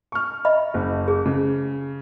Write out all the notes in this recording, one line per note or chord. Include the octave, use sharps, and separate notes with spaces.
C#6 F6
D#5 E5 B5
F#1
G#4
C#3